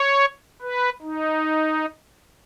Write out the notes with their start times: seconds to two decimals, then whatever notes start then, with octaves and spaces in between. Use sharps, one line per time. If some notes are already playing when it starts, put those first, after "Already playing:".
Already playing: C#5
0.62 B4
1.02 D#4